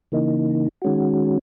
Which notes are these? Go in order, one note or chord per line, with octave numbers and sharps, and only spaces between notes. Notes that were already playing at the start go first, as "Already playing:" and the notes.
C#3 E3 A#3 D#4
D#3 G#3 C#4 F#4